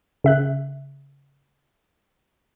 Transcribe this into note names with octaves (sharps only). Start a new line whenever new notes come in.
C#3 E5 F#6